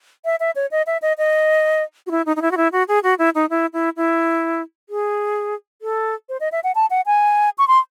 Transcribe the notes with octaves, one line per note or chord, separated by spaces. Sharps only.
E5
E5
C#5
D#5
E5
D#5
D#5
F#4
E4
D#4
D#4
E4
F#4
E4
F#4
G#4
F#4
E4
D#4
E4
E4
E4
G#4
A4
C5
D#5
E5
F#5
A5
F#5
G#5
C#6
C6